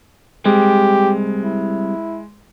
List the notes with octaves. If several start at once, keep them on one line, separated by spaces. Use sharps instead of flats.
G3 G#3 C4 G4
E4